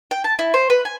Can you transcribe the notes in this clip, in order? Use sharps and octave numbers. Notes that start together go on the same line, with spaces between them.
G5
A5
E4
C5
B4
G#5